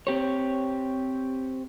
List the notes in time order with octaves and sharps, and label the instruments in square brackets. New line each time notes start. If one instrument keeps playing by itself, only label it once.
[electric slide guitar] C4 G4 C#5